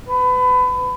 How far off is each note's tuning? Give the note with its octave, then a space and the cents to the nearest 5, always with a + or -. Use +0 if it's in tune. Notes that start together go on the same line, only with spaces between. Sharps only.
B4 +25